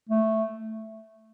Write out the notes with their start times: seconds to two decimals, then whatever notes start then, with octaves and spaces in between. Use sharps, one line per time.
0.09 A3